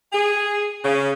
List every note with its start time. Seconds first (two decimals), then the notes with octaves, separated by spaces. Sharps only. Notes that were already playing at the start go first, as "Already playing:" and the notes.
0.13 G#4
0.84 C#3